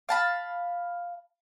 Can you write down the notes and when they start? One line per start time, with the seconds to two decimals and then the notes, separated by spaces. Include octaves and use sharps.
0.09 F5 A5 B5